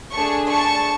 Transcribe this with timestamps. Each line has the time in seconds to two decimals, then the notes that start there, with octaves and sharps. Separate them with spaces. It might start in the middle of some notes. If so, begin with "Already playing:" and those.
0.13 A3 D4 G#4 A5 C#6
0.50 A5 C#6